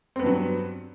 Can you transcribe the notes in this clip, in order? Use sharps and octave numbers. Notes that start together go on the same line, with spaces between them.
G2 F#3 B3 C4